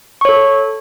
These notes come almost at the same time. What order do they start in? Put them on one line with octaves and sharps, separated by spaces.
C#6 C#5 A4